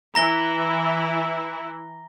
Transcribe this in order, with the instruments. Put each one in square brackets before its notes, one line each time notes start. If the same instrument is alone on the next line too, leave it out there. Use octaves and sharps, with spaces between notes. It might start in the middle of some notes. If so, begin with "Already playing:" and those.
[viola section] E3 E4 [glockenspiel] A#5 A#6 G7